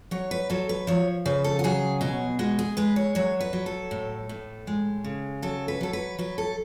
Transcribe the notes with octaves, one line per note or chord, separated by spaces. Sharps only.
F#3 C#5
B4
F#3 A4
B4
F3 C#5
C#3 B4
A4
F#4
F#3 G#4
B2 G#4
G#3 F#4
G#4
G#3 B4
C#5
F#3 C#5
B4
F#3
A4
A2
A2
G#3
C#3
F#3 A4
B4
F#3 A4
B4
F#3 B4
A4